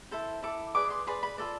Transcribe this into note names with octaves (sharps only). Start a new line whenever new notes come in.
E4 A4 C5
E4 A4 D6
G#4 B4 D5 D6
C6
G#4 B4 D5 C6
B5
F4 A4 D5